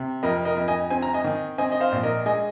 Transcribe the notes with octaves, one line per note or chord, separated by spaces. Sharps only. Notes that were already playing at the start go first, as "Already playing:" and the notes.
Already playing: C3
F2 A#4 D#5
A#4 D#5
F2
D#5 G#5
C4 G#5
A#5
D#5 G#5
D#3
C4 D#5 G#5
D#5
C5 F5
A#1
A#4 D#5
G#3 D#5 G#5